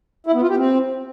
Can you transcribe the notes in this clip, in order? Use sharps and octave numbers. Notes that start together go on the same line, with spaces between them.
E4
B3
F4
G4
C4